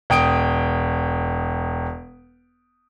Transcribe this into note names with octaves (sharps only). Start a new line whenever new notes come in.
E1 G5 D#6 D7